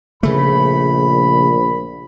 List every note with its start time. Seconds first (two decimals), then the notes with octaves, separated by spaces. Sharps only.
0.23 A#1 C#3 A3 B5